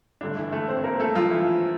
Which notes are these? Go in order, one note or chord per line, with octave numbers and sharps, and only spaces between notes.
G2 D3 A3 D4
E3 E4
A3 A4
C4 C5
A#3 A#4
A3 A4
F3 F4
E3 E4